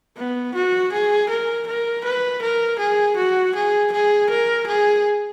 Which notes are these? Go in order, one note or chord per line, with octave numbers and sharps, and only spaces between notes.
B3
F#4
G#4
A#4
A#4
B4
A#4
G#4
F#4
G#4
G#4
A#4
G#4